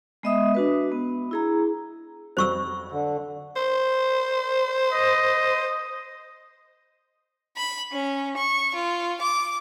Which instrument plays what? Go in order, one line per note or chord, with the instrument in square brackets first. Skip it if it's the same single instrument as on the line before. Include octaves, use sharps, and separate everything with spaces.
[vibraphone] G#3 B3 D#5 E5 D#6
D4 F#4 B4
B3
E4 G#4 A#5
[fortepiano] F2 F#3 G3 [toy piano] C5 C#6 E6
[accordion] D3
[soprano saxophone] C5
[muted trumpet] D#5
[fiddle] B5
C#4
C#6
F4
D6